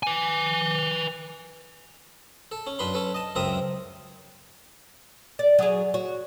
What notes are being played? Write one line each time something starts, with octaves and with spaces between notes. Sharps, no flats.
B4 G#5
A4
C#4
F#2 D4 B4 B5 C6
C#4 A4 B4
D#5 A5
C#2 F#2 C4 A#4 E5 D#6
D5
F#3 G#4
F#4 C#5